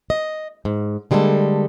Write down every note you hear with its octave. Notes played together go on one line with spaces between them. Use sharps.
D#5
G#2
D3 G3 G#3 A#3 A4